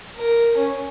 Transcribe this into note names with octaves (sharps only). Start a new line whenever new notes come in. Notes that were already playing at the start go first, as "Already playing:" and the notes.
A#4
C#4